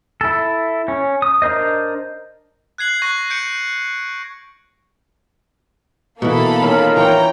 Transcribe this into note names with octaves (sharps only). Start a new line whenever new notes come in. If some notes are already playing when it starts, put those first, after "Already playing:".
E4 A4
C#4
D#6
D4 A#4 C5 D#5
F#6 G#6 C7 F#7
C#6 F#6 A#6
G6 C#7 D7
B2 E3 A#3 A4 B5
D#3 C#4 F4 A#4
E3 C#5 G5 A#5